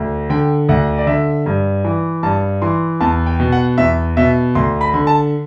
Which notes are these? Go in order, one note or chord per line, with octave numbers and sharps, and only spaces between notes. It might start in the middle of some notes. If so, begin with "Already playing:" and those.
Already playing: D2
D3 G5
D2 F#5
D5
D3 E5
G2
E3
G2 A5
E3 C6
E2 A5
G5
B2
F#5
E2 E5
B2 E5
D2 C6
B5
D3
A5